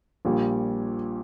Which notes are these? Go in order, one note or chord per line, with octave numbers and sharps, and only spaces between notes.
A#1 A#2 G3